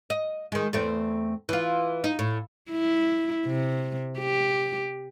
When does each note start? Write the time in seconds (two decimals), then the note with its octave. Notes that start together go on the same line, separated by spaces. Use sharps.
0.10 D#5
0.52 D#3 G#3
0.73 E2 A3 C4
1.49 E3 F4
2.04 D#4
2.19 A2
2.70 E4
3.46 C3
4.19 G4